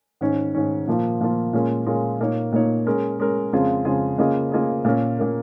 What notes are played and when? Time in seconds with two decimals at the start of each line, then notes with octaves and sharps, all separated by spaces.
0.21 G#2 D#3 C#4
0.55 G#2 D#3 C#4
0.87 A#2 F3 A#3 F4
1.21 A#2 F3 A#3 F4
1.53 A#2 G#3 C#4 F4 A#4
1.86 A#2 G#3 C#4 F4 A#4
2.20 A#2 A#3 D#4 C#5
2.52 A#2 A#3 D#4 C#5
2.86 G#3 C#4 A#4
3.19 G#3 C#4 A#4
3.53 F2 C#3 G#3 F4 G#4
3.85 F2 C#3 G#3 F4 G#4
4.18 C#3 A#3 F4 G#4 D#5
4.52 C#3 A#3 F4 G#4 D#5
4.85 A#2 A#3 C#4 A#4
5.18 A#2 A#3 C#4 A#4